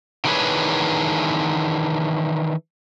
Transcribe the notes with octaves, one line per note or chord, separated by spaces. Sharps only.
D#3 E3 D4 G#4 B4 C#5